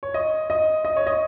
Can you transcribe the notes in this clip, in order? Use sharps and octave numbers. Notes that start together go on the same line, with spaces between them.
C#5
D#5
D#5
D#5
C#5
D#5